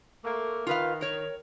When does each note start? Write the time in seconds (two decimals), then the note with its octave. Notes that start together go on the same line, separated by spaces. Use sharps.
0.24 A3 A#3
0.67 D#3 F4 B4 F5
1.01 A#4 C#5